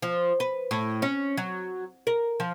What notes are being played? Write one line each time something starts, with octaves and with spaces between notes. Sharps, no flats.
F3
B4
A2
C#4
F#3
A#4
F3